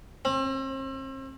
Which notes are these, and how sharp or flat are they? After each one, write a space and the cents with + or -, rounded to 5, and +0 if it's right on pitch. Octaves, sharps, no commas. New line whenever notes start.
C4 +40